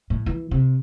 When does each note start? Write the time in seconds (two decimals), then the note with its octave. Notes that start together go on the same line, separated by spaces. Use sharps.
0.10 A2
0.26 E3
0.51 C3